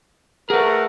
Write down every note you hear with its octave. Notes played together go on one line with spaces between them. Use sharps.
A3 G#4 A#4 B4 F#5